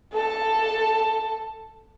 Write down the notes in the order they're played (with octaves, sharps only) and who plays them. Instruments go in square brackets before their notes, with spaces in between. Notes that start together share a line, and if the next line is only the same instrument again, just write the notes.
[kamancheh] A4 A5